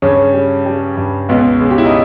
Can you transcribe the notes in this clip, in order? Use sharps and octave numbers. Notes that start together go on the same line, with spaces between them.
G2 C#3 C#4
G3
G3
G2
C#2 B2 B3
C#3
G4
E4
D#4